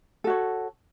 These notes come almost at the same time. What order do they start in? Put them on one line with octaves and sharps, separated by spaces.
A4 F#4 C#5